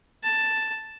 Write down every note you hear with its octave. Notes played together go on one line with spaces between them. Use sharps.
A5